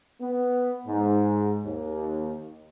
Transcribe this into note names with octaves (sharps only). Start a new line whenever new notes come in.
B3
G#2
D#2